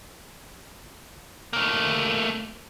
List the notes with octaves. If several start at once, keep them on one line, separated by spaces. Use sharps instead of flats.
A3 A#3